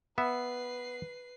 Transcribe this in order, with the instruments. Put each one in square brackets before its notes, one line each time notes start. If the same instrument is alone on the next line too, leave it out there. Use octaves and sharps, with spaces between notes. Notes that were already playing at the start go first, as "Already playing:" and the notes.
[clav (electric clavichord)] B3 E5 [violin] B4 C7